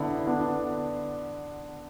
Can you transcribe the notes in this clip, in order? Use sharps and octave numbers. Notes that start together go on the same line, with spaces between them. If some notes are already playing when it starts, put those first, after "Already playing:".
Already playing: D3 B3 E4
D3 B3 D4